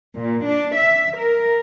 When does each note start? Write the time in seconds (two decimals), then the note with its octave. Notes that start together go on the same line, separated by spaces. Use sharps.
0.16 A#2
0.49 D4
0.77 E5
1.19 A#4